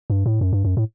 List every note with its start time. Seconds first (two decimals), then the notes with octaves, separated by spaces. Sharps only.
0.10 G2
0.26 A2
0.41 F#2
0.53 G2
0.64 F#2
0.77 A2